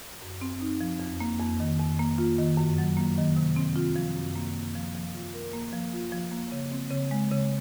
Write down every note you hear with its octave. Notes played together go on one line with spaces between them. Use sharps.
F#2
C4
D#4
F3
F2
A#3
F2
D#3
F2
A#3
F4
D#3
F#2
F#3
A#3
D#3
C3
C4
F4
F3
F#2
A#3
F#2
F3
F3
F4
A#4
A#3
F3
F4
F3
A#3
C#3
C4
C#3
G#3
C#3